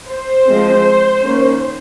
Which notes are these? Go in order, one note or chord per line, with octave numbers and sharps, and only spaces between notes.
C5
F3 G#3 C4
D#3 A#3 C#4